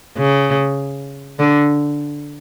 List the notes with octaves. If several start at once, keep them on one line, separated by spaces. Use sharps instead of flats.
C#3
D3